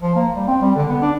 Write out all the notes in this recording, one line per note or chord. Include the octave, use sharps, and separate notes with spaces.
F3
A#3
G3
C4
G3
D3
B3
D4